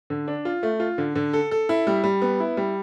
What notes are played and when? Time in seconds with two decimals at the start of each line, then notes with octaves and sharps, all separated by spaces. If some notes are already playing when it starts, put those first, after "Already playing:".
0.10 D3
0.28 D4
0.45 F4
0.63 A3
0.80 F4
0.98 D3
1.15 D3
1.33 A4
1.51 A4
1.69 E4
1.87 G3
2.04 G3
2.22 B3
2.40 E4
2.57 G3